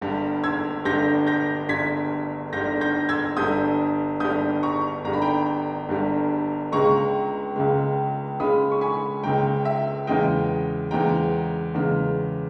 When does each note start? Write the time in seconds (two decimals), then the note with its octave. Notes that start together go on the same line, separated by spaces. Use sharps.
0.01 G1 G2 G3
0.44 E6 G#6
0.85 G1 G2 G3 G6 A#6
1.27 G6 A#6
1.69 G1 G2 G3 G#6 B6
2.53 G1 G2 G3 G6 A#6
2.81 G6 A#6
3.09 E6 G#6
3.37 G1 G2 G3 D#6 G6
4.20 G1 G2 G3 D#6 G6
4.63 A#5 C#6
5.04 G1 G2 G3 A#5
5.13 B5
5.22 G5 A#5
5.89 G1 G2 G3
6.72 C#2 C#3 G#3 A#5 C#6
7.56 C#2 C#3 G#3
8.40 C#2 C#3 G#3 B5 D#6
8.72 C#6
8.81 G#5 B5
9.23 C#2 C#3 G#3 G5 A#5
9.65 E5
10.07 E2 C#3 G#3 D#5 G5
10.91 E2 C#3 G#3 G5 A#5
11.74 E2 C#3 G#3